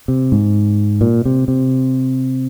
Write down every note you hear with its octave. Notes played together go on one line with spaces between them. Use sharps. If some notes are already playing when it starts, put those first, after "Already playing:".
C3
G#2
A#2
C3
C3